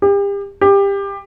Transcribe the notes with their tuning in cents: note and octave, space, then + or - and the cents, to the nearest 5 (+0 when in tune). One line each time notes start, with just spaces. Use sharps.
G4 +35
G4 +20